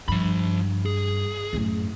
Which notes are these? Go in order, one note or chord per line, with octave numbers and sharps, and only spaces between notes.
G2 F3 B5
G#4
F#2 A2